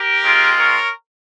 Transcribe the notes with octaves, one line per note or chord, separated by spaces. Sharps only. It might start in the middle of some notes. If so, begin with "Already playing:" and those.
Already playing: G4 A#4
G#3 C4 F4
A#4 C#5